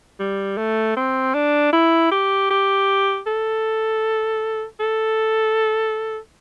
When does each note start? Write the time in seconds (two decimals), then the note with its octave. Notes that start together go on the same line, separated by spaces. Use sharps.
0.19 G3
0.57 A3
0.97 C4
1.34 D4
1.72 E4
2.11 G4
2.50 G4
3.26 A4
4.80 A4